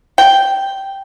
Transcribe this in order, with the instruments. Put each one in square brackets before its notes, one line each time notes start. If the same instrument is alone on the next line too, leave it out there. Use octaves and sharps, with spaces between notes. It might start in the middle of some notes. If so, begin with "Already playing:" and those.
[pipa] G5